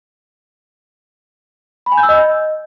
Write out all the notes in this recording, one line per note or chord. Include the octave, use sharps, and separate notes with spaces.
B5
G#5
G6
E6
D#5